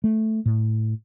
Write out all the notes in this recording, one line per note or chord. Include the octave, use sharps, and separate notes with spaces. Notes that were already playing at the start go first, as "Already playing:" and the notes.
A3
A2